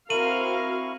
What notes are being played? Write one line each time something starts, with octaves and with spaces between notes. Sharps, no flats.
C4 E4 F#4 A#4 F5 C#6 D#7 F#7